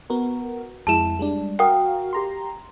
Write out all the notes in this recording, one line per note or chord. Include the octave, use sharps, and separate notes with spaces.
B3 F#4 A#4
F2 G#3 E4 A5 E7
G3 G#3 D4
F#4 A#4 F5 G5 D#6
G4 A#5 C6